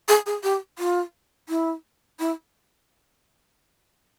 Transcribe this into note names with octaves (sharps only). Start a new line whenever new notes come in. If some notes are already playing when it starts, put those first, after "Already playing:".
G#4
G#4
G4
F4
E4
E4